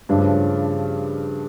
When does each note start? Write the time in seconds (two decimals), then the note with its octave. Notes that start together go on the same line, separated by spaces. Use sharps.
0.09 G2 C#3 F3 A3 D4